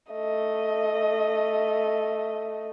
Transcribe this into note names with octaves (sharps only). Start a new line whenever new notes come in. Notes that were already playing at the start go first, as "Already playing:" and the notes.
A3 D#5